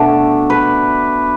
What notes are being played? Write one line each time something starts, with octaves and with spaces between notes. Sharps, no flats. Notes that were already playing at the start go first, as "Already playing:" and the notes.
Already playing: B2 A3 D4
B4